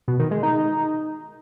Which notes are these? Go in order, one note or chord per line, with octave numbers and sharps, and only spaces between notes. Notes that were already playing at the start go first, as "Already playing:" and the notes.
B2
D#3
G#3
D#4